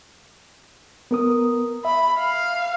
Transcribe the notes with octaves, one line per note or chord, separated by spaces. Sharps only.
B3 A#4 D#6
E5 B5
F5